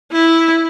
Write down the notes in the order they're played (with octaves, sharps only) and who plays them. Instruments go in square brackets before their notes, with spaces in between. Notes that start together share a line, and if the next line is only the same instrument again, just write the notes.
[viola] E4